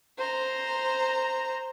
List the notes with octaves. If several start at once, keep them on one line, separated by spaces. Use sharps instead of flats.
C5 A#5